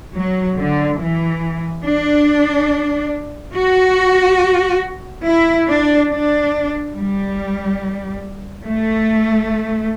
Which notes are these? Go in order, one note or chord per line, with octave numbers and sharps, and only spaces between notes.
F#3
D3
E3
D4
F#4
E4
D4
D4
G3
A3